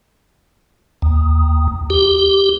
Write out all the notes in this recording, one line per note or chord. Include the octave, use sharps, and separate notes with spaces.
D#2
G4